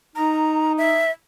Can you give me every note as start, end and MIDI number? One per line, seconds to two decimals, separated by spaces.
0.15 1.04 63
0.15 0.73 82
0.78 1.11 76